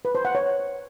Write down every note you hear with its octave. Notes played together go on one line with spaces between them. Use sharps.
B4
C5
F#5
C#5